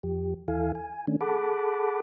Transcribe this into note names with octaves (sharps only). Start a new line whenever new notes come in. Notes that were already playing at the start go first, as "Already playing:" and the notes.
F2 F3 G4
D#2 E3 E4 A4 F5 G#5
G#5
D#3 A3 C#4 D4
G#4 A4 F#5 A5 B5 D6